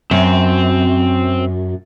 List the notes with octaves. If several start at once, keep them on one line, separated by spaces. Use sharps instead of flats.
F#2 C4